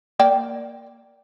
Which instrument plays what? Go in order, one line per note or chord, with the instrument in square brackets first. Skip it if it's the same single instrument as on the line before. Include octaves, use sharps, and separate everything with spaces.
[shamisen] A#3 D5 G5